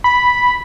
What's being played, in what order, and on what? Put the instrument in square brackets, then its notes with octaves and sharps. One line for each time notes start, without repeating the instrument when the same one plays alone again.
[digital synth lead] B5